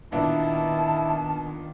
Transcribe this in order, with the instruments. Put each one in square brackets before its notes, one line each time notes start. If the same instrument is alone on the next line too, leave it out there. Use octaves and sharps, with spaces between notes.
[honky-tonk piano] A#2 B3 D4 [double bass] D#3 [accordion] E4 [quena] A5